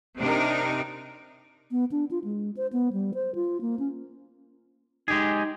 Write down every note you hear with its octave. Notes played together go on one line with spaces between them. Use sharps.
C3 D4 D#4 A#4
B3
D4
F4
G#3
C5
B3
G3
C5
F4
A#3
C#4
G#3 D#4 G4 G#4